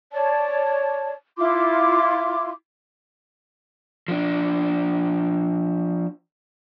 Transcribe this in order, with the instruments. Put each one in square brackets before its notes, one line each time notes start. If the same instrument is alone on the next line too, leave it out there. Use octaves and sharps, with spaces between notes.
[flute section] C#5 D5 A5
E4 F4 C6 D6
[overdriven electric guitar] F3 D4